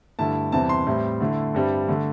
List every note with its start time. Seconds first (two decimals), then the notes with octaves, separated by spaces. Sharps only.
0.19 G2 D3 A3 E4 A5
0.52 E2 C3 G3 C4 E4 A5
0.69 C6
0.87 A2 G3 C4 E4
1.20 D3 A3 E4
1.54 G2 G3 C4 E4
1.88 D3 A3